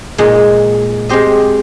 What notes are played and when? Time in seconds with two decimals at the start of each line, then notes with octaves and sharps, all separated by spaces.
0.18 A#2 G#3 D#4
1.09 G#3 C4 G4 C5 D#5